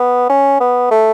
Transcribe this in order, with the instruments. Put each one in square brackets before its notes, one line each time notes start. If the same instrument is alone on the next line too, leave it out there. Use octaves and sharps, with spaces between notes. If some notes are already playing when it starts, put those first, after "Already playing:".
Already playing: [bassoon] B3
C#4
B3
A3